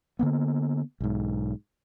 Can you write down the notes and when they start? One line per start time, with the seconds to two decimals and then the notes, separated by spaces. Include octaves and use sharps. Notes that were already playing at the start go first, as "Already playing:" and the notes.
0.19 D3 A#3 B3
1.01 B1 G#2